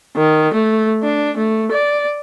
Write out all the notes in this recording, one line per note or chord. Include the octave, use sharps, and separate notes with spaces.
D#3
A3
D4
A3
D5